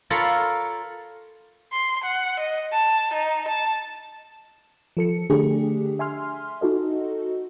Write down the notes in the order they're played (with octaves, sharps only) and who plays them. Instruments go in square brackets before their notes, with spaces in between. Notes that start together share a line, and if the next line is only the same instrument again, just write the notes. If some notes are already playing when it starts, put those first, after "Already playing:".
[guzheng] F4 A4 A#4 C#5 F5 B5
[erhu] C6
F#5
D#5
A5
D#4
A5
[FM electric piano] F3 A4 C#7
D3 A3 D4 G4 G#4
E5 G#5 C6 F6
D#4 F#4 A4 D#5